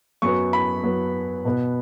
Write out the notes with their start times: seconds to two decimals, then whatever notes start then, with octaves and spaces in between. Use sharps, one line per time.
0.22 F#2 F#3 B3 C#6
0.53 B5
0.83 F#2 F#3 B3
1.45 B2 B3